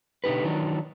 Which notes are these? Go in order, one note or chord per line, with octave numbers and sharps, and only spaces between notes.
B2 D3 D#4 G4 B4
D#3 E3 F#3 D4 D#4